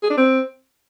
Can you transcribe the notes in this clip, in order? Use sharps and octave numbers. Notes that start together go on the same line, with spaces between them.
G#4
D4
C4